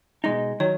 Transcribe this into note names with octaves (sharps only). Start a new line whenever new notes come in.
B2 G#3 D#4 D#5
D#3 F#3 C#5